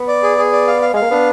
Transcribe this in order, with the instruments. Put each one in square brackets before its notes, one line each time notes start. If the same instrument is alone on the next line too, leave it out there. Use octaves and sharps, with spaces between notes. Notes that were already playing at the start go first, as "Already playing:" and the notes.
Already playing: [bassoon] B3
[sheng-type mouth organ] D5
G#4
G#4
D5
F5
F5
[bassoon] G#3 [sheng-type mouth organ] F5
[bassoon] A#3
[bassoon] B3 [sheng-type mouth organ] D4